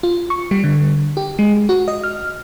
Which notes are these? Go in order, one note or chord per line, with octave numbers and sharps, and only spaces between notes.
F4
C#6
G3
D3
G4
G#3
F#4
D#5
F6